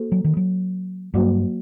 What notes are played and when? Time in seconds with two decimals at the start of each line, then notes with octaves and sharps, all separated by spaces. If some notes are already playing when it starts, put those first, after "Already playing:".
Already playing: A#3 F#4 A4 C5
0.12 F#3
0.24 D#3
0.37 F#3
1.14 G2 F#3 A#3 F#4 C5